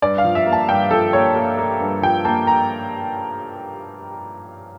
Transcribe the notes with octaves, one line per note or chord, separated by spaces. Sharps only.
G2 D5
F5
F3
E5
A#3
A5
G2 G5
F3 A4
A#3 C#5
A#3
A#3
G2
F3 G5
A#3 A5
A#5